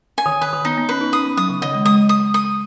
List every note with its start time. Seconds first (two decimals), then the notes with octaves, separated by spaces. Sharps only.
0.18 G#5
0.26 D#3
0.41 D#3 B4
0.53 D#3
0.65 B3 D#4
0.78 B3
0.89 C#4 B4
1.01 D#4
1.13 C#4 D#6
1.25 B3
1.37 F#3 D#6
1.49 C#3
1.62 D#3 D#5
1.74 G#3
1.85 G#3 D#6
2.09 D#6
2.34 D#6